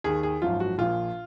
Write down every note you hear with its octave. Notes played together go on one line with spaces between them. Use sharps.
D#2 D#3 G#4
G#4
G#1 F#2 F3 F4
F#4
A#1 A#2 F3 F4